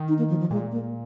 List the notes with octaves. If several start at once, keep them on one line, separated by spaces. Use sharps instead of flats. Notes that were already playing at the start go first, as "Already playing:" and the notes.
Already playing: D#3
D#4
A#3
F3
F3
A#2 G#3
A#3